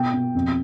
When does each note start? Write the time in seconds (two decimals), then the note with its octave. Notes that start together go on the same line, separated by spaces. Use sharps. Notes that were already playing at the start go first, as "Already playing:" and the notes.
Already playing: B2 G5
0.13 B2
0.35 F2